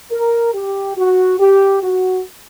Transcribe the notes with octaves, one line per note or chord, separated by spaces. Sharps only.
A#4
G4
F#4
G4
F#4